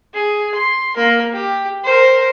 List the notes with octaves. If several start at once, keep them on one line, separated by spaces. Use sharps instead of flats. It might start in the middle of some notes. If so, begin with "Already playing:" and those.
G#4
C6
A#3 A#4
G4
A#4 C5